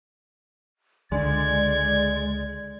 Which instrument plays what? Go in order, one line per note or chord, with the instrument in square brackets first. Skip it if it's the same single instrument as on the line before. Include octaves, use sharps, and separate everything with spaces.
[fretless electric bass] C#2 D3 [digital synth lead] G#3 [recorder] D5 [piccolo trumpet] G#6